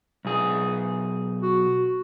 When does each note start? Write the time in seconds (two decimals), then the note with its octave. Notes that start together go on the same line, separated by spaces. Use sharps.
0.25 B1 G#4
1.42 F#4